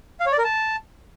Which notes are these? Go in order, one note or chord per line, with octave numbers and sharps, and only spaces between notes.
F5
C#5
D5
A#4
A5